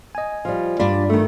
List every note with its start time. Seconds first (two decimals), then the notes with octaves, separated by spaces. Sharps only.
0.15 D#5 G#5
0.45 F3 G3
0.79 G2 D4 F4 G4 B5
1.09 D#3 A3